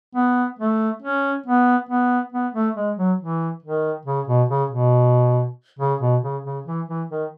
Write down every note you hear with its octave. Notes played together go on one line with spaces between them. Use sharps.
B3
A3
C#4
B3
B3
B3
A3
G#3
F#3
E3
D#3
C#3
B2
C#3
B2
C#3
B2
C#3
C#3
E3
E3
D#3